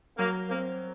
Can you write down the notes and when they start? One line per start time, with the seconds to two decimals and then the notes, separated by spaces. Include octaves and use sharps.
0.18 F#3 A#3
0.49 A#3 C4